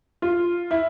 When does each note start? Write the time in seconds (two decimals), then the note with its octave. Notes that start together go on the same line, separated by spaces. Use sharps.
0.22 F4
0.71 E4